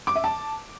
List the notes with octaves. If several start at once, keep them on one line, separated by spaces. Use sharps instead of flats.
D6
E5
A5